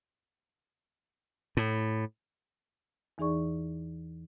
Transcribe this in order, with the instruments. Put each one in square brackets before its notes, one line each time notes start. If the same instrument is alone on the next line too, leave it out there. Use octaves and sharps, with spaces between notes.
[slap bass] A2
[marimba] E2 E3 D#4 G#4 D5 C#6